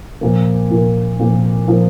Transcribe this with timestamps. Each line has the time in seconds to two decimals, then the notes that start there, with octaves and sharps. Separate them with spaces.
0.21 A#2 F3 A#3
0.70 A#2 F3 A#3
1.19 A#2 F3 A#3
1.68 A#2 F3 A#3